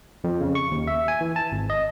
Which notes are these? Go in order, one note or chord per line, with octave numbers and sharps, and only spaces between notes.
F2
C#3
C#6
D#2
E5
G#5
E3
A5
G#1
D#5